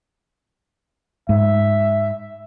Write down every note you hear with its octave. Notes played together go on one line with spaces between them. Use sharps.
G#2 E5